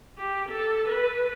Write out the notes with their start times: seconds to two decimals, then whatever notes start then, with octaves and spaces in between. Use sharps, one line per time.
0.18 G4
0.49 A4
0.88 B4